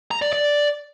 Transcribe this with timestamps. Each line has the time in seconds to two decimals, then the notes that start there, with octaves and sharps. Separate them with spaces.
0.11 A#5
0.22 D5
0.33 D5